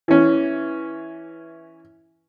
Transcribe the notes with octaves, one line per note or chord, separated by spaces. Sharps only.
E3 C#4